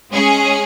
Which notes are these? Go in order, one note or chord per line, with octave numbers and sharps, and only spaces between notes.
G#3 C#4 G#4